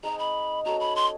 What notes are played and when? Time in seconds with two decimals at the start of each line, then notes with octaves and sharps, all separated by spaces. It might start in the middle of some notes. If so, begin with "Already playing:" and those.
0.03 G#3 C4 D#4 A#5
0.19 B5
0.65 C#4 F#4 A4 C#5 A#5
0.80 B5
0.96 C6